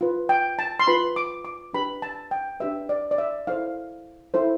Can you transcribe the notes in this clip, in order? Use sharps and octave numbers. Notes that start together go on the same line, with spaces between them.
F4 B4
G5
A5
C6
F4 B4 B5
D6
D6
D4 G4 B4 B5
A5
G5
D4 G4 B4 E5
D5
D5
E5
E4 A4 C5 F5
E4 A4 C5